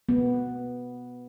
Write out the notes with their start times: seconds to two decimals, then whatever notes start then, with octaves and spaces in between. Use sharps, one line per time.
0.09 B3